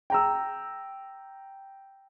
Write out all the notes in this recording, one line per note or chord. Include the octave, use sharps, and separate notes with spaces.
G5 A#5 E6